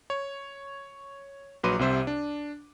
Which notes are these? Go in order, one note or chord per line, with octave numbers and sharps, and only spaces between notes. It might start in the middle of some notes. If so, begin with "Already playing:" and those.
C#5
A#1 F#3 B4 C6 D6 D#7
C2 C3 C5 E5
D4